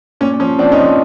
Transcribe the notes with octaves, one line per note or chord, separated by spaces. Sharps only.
A#2 C#4
F3 C#4
F3 C4 D4
C#4 D#4
F3